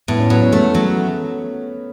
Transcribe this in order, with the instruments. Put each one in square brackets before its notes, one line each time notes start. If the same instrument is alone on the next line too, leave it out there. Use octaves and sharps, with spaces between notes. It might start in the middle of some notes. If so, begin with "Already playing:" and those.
[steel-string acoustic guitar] A2 [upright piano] B3
[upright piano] C#4
[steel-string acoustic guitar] F#3 [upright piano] B3
[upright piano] C#4
[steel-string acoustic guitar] A3 [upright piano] B3
[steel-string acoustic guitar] F#3